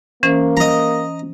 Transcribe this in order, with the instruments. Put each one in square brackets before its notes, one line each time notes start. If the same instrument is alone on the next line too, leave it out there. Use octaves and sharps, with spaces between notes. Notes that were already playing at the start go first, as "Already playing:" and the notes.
[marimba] E3 C#4 C5 [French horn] A#3
[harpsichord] D#5 A#5